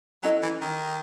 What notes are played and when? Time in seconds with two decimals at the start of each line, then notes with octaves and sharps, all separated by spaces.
0.23 F#3 C#4 E4 A4 D#5
0.42 E3
0.61 D#3